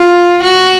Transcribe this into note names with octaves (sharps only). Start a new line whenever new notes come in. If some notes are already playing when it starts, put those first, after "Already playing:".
Already playing: F4
F#4